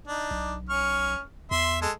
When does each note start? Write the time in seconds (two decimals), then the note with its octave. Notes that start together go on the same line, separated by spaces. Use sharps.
0.07 D4 D#4
0.31 B1
0.69 C#4 C#6 F6
1.51 E2 E5 C6
1.82 G#3 A4